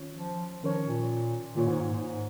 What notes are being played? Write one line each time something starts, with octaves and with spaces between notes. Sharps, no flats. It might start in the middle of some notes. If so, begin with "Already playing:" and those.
Already playing: D#3 C#4 F4 C#5
F3
D#3 F3 C#4 A#4 C#5
A#2
A#2 D#3 A#3 F4 C#5
G#2
G#2